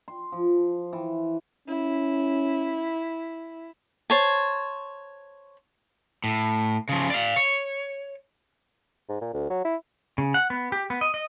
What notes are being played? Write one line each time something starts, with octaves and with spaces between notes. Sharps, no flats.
C6
F3
E3
C#4 E4
C5 C#5 A5
A2
C#3 F3
D5 F5
C#5
G#2
A#2
D2
F#3
E4
C#3
F#5
B3
G4
B3
D#5
D#5